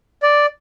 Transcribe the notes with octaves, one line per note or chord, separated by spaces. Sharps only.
D5